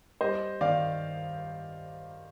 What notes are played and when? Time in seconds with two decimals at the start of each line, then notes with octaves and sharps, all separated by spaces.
0.21 G3 C5 D#5
0.61 D#3 D5 F5